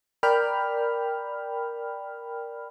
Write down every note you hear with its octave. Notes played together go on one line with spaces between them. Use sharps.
A#4 D5 G5 B5 F6